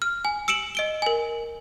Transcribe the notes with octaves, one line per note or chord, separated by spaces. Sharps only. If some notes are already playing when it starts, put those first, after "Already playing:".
F6
G#5
E6 C#7 D7 E7 F#7
D#5 D7 G7
A#4 G#5